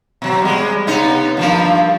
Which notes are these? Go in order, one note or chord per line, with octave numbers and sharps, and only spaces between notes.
B2 F#3 C4
G3 G#3
C3 B3 D#4
G2 F3 A#3